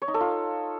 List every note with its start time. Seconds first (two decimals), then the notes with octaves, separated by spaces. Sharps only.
0.02 C#5
0.08 D#4
0.14 A4
0.20 F4